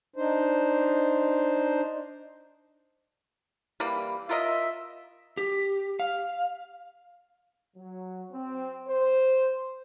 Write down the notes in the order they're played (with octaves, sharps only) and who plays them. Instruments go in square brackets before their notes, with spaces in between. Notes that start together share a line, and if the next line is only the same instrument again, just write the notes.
[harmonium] D4 D#4 C5
[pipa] E3 G3 A#3
[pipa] F4 A#4 D#5 [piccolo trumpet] E5
[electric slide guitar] G4
F5
[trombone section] F#3
C4
C5